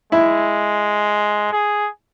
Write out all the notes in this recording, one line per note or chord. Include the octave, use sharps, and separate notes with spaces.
G#3 E4
G#4